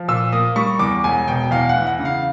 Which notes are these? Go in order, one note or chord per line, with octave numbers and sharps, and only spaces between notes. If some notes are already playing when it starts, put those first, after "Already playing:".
Already playing: F3
A#2 E6
A#3 D#6
G3 C#6
E2 D6
E1 G#5
B2 G5
E2 F5
F#5
E3
F#5
C#3
F5